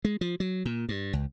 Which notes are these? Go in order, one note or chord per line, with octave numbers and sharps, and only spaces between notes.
G#3
F3
F#3
A#2
G2
C#2